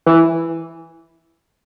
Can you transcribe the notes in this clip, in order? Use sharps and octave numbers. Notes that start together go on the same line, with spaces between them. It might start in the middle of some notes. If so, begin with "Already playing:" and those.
E3